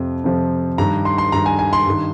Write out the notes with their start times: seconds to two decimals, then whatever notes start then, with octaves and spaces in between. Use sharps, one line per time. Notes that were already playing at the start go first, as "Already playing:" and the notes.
Already playing: F2 C3 F3
0.24 F2 C3 F3
0.78 G2 D#3 A#5
1.05 C6
1.18 C6
1.32 G2 D#3 A#5
1.46 G#5
1.59 G#5
1.73 C6
1.87 G2 D#3